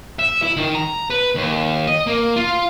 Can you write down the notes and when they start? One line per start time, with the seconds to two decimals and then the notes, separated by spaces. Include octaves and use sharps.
0.19 E5
0.42 E4
0.56 D#3
0.75 A#5
1.10 B4
1.35 D#2
1.87 D#5
2.07 A#3
2.36 F4